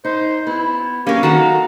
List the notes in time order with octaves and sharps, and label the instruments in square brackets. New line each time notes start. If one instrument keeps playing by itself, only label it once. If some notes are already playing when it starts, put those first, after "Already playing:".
[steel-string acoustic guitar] D#4 [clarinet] C5
[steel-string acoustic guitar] B3 [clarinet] E4
[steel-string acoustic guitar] F#3 A#3 [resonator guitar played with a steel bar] C#4 A#4 [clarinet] G4 [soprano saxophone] F5
[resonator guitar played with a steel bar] D#3 F#4 A4 [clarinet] A#5